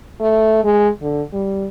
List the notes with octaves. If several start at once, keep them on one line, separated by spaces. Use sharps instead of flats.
A3
G#3
D3
G3